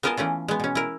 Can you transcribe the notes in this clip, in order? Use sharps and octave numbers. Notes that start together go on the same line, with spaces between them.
B3 F4 A#4 D#5 G#5 A5
E3 A3 C#4 F4
G#3 B3
B2 C#4
E4 A#4